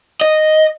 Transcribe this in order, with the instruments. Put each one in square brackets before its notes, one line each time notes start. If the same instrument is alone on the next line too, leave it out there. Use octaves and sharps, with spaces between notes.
[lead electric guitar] D#5